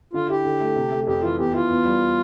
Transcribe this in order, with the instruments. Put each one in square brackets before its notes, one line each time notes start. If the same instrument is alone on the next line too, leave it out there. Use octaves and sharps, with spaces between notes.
[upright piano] D3 [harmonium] F4
[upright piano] E4 [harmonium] G4
[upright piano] D3
A3
C3
A3
[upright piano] F2 [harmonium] G4
[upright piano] E3 [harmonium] F4
[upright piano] E2 [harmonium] G4
[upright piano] E3 [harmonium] F4
[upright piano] E2
G3